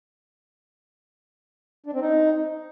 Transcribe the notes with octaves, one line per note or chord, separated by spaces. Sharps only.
D4
C4
D#4